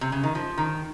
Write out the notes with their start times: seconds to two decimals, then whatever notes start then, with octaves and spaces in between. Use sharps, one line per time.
0.01 C3
0.12 C#3
0.23 D#3
0.35 F3
0.57 D#3